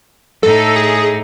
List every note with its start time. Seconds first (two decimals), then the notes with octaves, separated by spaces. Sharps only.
0.43 A2 D#4 A4
0.76 G#4